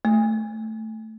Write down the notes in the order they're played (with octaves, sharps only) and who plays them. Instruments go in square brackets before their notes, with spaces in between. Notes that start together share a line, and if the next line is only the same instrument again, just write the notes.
[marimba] A3